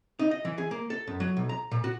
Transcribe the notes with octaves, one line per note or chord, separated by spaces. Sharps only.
D#4
D#5
E3
G#4
A#3
A4
F#2
F#3
B1
A#5
A#2
F#4